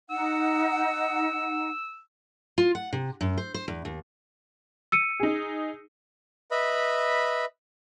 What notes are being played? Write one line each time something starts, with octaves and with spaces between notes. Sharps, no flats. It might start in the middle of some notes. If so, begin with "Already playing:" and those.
D#4 F#5 E6
F4
F#5
C3
F#2
C5
C5
E2
D#2
E6 C#7 D#7
D#4 G#4
B4 D#5 E5 B5